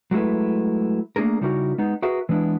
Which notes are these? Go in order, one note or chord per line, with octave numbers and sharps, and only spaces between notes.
F#3 G#3 A3 E4 B4
A3 A#3 D4 G#4 A#4
C#3 G3 D#4 E4 F#4 A#4
G#3 B3 D#4
F#4 G#4 A#4 B4 E5
E3 G#3 B3 D4 E4